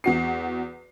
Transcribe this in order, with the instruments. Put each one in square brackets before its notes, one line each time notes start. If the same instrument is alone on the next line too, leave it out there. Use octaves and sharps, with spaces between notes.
[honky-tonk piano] E2 F#4 C7